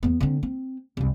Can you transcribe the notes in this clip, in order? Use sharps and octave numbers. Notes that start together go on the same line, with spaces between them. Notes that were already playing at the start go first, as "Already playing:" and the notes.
E2 B3
D3 C4
C4
C2 F#2